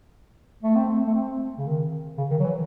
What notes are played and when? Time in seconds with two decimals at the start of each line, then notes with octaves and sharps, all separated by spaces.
0.63 A3
0.75 C4
0.88 A3
1.07 A3
1.14 C4
1.58 C#3
1.66 D#3
2.18 C#3
2.31 D#3
2.40 F#3
2.43 E3